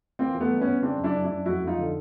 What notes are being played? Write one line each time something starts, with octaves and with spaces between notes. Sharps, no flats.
E3 A#3 C4
E3
A3 B3
G2
G2 B3 C#4
C#3 C4 D4
F#2
D4 E4
F#2
D4 E4
F#2
F2 E4 F#4
F2
D#4 F4
D3